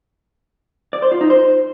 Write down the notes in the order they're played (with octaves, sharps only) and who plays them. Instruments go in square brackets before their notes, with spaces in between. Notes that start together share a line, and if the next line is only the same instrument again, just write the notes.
[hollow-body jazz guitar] D5
C5
F4
D#4
C5